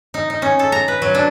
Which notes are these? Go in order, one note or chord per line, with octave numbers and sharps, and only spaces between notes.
D#4
D#4
C#4
A4
A#5
B4
F#3
D4